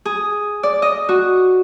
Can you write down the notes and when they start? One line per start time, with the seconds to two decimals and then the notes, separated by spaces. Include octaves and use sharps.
0.05 G#4
0.63 D5
0.82 D#5
1.09 F#4